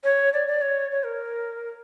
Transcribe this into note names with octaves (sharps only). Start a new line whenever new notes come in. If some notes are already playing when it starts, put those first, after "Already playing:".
C#5
D5
D5
C#5
C#5
A#4